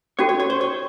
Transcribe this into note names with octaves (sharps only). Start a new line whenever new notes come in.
C#4 F#4 A4 C#5
C#5
C#5
C5
C#5